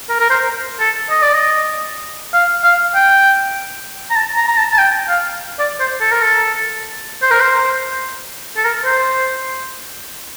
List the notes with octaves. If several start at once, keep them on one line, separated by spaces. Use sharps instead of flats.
A#4
A#4
C5
A4
D#5
D5
D#5
F5
F5
G5
A#5
A5
A#5
A#5
A5
A5
G5
F5
D5
C5
A4
A#4
A4
C5
A#4
C5
A4
A#4
C5